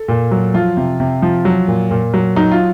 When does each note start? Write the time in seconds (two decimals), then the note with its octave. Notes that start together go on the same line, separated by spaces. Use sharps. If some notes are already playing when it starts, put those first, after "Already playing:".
Already playing: A4
0.08 A#2
0.32 F#3
0.54 F3 F4
0.77 C3
1.00 C3
1.22 F3
1.45 F#3
1.68 A#2
1.91 A#2
2.14 F#3
2.36 F#3 D#4
2.52 F4